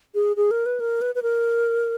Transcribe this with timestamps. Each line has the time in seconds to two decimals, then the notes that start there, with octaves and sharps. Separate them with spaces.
0.15 G#4
0.36 G#4
0.51 A#4
0.66 B4
0.80 A#4
1.01 B4
1.15 B4
1.23 A#4